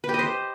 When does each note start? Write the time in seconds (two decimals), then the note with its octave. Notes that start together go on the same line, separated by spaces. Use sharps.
0.04 B4
0.09 G4
0.14 D#5
0.19 C5